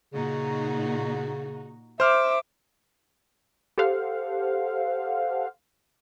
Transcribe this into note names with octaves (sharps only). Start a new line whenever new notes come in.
A#2 C#3 D#4 F#4
C5 E5 D6 F6
G4 A4 C5 F5 F#5